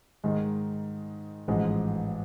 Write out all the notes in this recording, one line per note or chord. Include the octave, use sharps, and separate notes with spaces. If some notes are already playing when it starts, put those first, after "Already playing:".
G#2 D#3 G#3
A1 G#2 F3 G#3